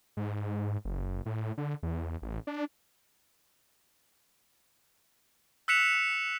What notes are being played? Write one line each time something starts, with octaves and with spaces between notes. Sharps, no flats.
G#2
F#1
A2
D3
E2
A1
D4
E6 F#6 B6 C#7 E7 F7